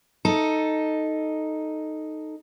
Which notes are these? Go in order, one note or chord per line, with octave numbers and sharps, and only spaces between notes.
D#4 A4